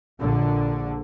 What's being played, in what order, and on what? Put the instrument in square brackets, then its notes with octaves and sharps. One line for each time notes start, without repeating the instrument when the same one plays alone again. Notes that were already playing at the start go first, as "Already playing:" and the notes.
[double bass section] A#1 D3